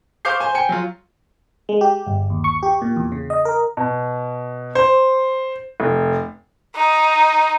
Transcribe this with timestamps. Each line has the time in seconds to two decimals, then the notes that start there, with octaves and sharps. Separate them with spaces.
0.25 C5 F5 C#6 D6 G6 C7
0.40 C5 G#5
0.55 G5 G#5 C#7
0.69 F#3 F4
1.69 G#3
1.81 G4
2.07 G1
2.30 D#2
2.44 C#6
2.63 G4
2.82 A#2
2.96 E2
3.12 C#3
3.30 D#5
3.45 A#4
3.77 B2
4.75 C5
5.80 F1
6.75 D#4